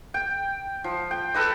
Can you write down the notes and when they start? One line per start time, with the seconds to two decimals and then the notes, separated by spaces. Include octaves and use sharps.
0.14 G5
0.84 F3
1.11 G5
1.34 A4 B4 D#5